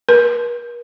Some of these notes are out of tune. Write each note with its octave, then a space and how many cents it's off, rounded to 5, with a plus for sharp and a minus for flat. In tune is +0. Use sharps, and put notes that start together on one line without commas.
A#4 +45